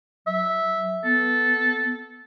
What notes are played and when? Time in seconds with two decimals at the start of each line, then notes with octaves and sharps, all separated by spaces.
0.27 F#3 E5
1.04 B3 A4